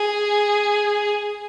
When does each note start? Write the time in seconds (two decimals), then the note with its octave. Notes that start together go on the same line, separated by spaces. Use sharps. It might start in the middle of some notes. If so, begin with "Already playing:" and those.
Already playing: G#4